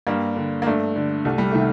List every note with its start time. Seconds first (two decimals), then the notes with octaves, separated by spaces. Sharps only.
0.07 G2 G3 A#3
0.36 D3
0.62 A#3
0.66 G2 A3
0.96 D3
1.25 C2 A3
1.38 G3
1.52 C3 D#3 A3